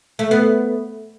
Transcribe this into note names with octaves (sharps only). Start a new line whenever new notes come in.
A3
B3